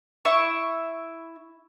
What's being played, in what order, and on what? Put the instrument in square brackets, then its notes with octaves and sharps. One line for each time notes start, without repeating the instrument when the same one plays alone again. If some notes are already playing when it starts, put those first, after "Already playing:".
[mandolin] E4 E5 C#6